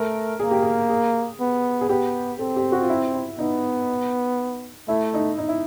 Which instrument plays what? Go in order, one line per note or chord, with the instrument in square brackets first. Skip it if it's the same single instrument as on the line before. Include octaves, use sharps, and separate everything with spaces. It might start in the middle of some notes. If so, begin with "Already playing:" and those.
Already playing: [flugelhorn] A3 [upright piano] A#4
[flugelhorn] A#3 [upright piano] G#4
[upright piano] G4
G#4
G#4
[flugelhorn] B3
[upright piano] G#4
[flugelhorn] B3 [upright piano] G4
[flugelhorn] C4 [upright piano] A4
[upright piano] G4
F#4
F4
E4
E4
[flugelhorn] B3 [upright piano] D#4
[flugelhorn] A3 [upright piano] E4
[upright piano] D#4
D#4
E4